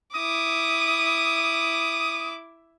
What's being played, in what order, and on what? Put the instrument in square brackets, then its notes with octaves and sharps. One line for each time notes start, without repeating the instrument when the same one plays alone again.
[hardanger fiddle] E4 D6 [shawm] D#6